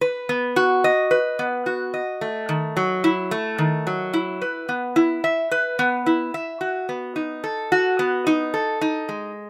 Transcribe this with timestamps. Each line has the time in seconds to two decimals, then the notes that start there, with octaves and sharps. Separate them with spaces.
0.01 B4
0.29 B3
0.56 F#4
0.84 D#5
1.11 B4
1.39 B3
1.66 F#4
1.94 D#5
2.21 A3
2.49 D#3
2.77 F#3
3.04 E4
3.31 A3
3.58 D#3
3.87 F#3
4.14 E4
4.41 B4
4.69 B3
4.96 E4
5.24 E5
5.51 B4
5.79 B3
6.06 E4
6.34 E5
6.61 F#4
6.89 B3
7.16 D#4
7.44 A4
7.72 F#4
7.99 B3
8.27 D#4
8.54 A4
8.81 D#4
9.09 G#3